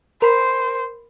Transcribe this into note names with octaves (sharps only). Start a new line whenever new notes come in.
A#4 C5 B5